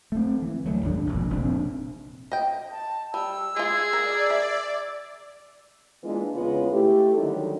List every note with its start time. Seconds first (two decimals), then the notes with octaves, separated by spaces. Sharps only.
0.12 A3 C4
0.42 E3
0.64 D2 F#3 A3
0.83 D#2 G#2 D4
1.07 E1 A#1
1.30 F1 A#2 C4 D4
2.32 D#5 G5
2.71 A5
3.14 G3 E6
3.56 G#3 F4 G#4
3.93 A#4 D5
4.30 E5
6.03 E3 G#3 A#3 B3 D4 F4
6.35 E2 C#3 G#3 B3 F4
6.71 A3 E4 G4
7.15 D3 D#3 F#3 G3 C#4 D#4